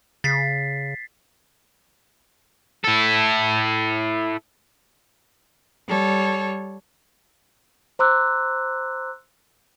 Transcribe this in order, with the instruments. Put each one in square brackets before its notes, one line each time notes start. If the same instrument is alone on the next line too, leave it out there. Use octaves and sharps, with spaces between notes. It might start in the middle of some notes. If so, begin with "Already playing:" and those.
[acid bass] C#3 [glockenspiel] A6 B6 C7
[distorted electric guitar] E4 A4
[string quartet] G3 A4 C#5
[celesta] C5 A#5 C6 D6 E6 F#6